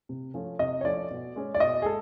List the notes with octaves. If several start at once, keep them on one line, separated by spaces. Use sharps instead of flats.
C3
F3 A3 C#4
C3 D#5
C#5
F3 A3 C#4 D5
B2
G#3 C#4
D5
B2 D#5
G#4
G#3 A4